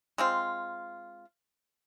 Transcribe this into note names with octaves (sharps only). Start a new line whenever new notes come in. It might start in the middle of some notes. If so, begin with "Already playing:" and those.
G#3 C4 F4